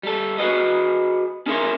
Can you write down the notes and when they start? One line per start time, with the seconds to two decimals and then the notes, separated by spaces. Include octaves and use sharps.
0.03 G3 A4
0.38 F#4 G#4 B4 D#5
1.46 C#4 D#4 G#4 A#4 E5 C6